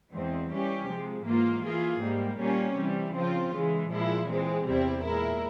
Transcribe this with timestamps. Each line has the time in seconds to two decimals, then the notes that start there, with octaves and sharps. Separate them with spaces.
0.13 E2 E3 G#3 C4
0.50 E3 G3 C#4 G4
0.89 C3 F3 G#3
1.26 G#2 E3 A#3 F4
1.64 E3 A#3 F4 G#4
2.02 G#2 G3 A#3
2.39 A#2 G3 A#3 C#4
2.76 C3 E3 G3
3.15 C#3 F3 C4 F4
3.52 C#3 E3 G#3
3.91 A#2 F3 G#3 E4
4.27 E3 G#3 C4
4.66 E2 C3 G3 C4 E4
5.04 A#2 G#3 E4 A#4